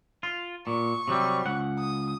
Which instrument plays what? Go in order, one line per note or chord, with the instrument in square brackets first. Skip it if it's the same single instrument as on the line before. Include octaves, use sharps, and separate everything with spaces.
[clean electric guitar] F4
[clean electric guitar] A#2 [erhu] C#6
[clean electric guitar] C3 F#3 G3
C#2 F#5
[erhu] D#6